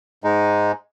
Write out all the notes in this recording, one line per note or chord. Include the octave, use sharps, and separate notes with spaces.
G#2 G#3 D#4